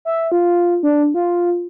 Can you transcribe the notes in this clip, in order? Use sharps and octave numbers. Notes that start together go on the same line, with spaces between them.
E5
F4
D4
F4